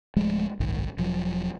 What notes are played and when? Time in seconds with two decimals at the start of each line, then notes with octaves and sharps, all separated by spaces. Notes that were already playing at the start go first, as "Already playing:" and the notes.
0.16 D1 F3 G#3 A3
0.60 F#1 B1 G#2 D#3
0.97 E1 F3 F#3